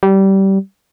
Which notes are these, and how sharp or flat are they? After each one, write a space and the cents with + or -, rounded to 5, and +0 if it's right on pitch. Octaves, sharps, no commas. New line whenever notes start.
G3 -20